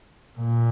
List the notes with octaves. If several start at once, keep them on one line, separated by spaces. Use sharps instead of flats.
A#2